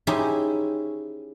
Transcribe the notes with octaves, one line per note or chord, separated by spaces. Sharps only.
C#4 D#4 E4 G4 G#4 C5